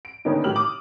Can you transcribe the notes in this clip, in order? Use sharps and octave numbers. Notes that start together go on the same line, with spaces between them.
D7
D3 D#3 A#3 B3 C#4 D#4
A2 F#3 G4 B5 F6 F#7
D6 D#6